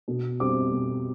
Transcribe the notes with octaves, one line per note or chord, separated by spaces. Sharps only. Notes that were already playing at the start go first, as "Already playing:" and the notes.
B2
G3 C4 D6
B2